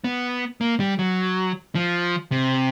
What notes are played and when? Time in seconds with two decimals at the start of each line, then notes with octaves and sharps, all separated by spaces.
0.04 B3
0.61 A#3
0.80 G3
0.99 F#3
1.75 F3
2.32 C3